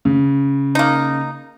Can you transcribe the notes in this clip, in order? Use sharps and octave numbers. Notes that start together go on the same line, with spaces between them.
C#3
A#3 D#4